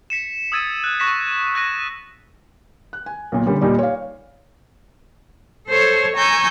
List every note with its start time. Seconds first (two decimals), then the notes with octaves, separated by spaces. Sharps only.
0.10 B6 C#7 E7
0.52 D#6 E6 G#6 A6 D#7
0.84 F#6
1.00 C#6 F#6 A#6 B6 E7
1.55 F#6 A#6 D#7
2.93 F#6
3.06 G#5
3.32 B1 A#2
3.46 D3 G3 C#4 A#4
3.61 D#2 A#2 G3 D#4 D5
3.79 C#5 F5
5.67 A4 C5 C#5
6.16 G#5 A#5 C#6 E6 G6